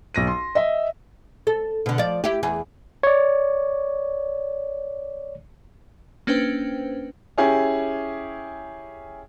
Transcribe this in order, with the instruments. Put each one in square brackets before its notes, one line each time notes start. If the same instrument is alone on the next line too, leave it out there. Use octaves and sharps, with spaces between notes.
[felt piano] B1 A#6 D#7
C6
D#5 E5
[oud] A4
B2 D3
F3 D5
E4 G4
E2 G#4
[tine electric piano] C#5 D5
[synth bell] A#3 C#4 D4 B4 C5 G5
[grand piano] C#4 E4 G4 G#4